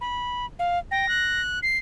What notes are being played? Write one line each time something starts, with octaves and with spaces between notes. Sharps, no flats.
B5
F5
G5 A#6
F#6
C7